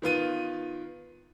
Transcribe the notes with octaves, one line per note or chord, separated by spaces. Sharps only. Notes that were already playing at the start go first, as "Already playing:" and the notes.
D#3 B3 F4 D#7